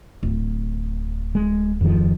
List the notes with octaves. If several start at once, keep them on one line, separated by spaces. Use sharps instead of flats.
D1
G#3
F2 D#3 F3